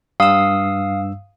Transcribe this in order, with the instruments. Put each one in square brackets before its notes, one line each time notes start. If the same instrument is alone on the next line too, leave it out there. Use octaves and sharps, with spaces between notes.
[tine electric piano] G2 E6 [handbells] F5 D#6